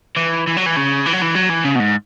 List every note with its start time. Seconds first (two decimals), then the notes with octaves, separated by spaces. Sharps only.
0.17 E3
0.47 E3
0.57 F#3
0.66 E3
0.77 C#3
1.06 E3
1.13 F#3
1.22 E3
1.36 F#3
1.50 E3
1.65 C#3
1.76 B2
1.80 G#2